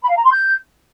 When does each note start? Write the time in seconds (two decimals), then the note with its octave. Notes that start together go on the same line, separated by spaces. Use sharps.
0.02 B5
0.10 F5
0.17 A#5
0.24 C6
0.32 G6